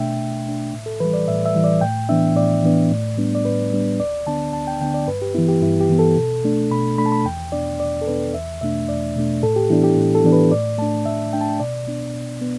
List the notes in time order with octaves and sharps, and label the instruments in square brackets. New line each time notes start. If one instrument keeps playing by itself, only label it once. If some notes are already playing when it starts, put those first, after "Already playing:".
Already playing: [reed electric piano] B2 A3 D4 E5 G5
B2
A3 D4
A2
A4
E3 G3 B4
D5
A2 E5
E5
E3 G3
D5
A2 G5
E3 B3 D4 E5
A2 D5
E3 B3 D4
A2
G3 B3 D4
D5
A2 B4
G3 B3 D4
D2 D5
D3 B3 D4 A5
D2 A5
G5
D3 B3 D4 G5
D5
G2 B4
G4
E3 B3 E4
G4
G2 E4
G4
E3 B3
A4
B2
A3 D4
B2 B5
A3 D4 B5
A5
B5
E2 G5
B2 B3 D4 D5
E2 D5
A4
B2 B3 D4 B4
E2 E5
B2 A3 D4 E5
E2 D5
B2 A3 D4
A2 A4
G4
E3 B3 D4 E4
G4
A2
A4
E3 B3 D4
B4
A2 D5
A3 D4 A5
A2 E5
A3 D4 G5
A5
G5
B2 D5
B3 D4
B2
B3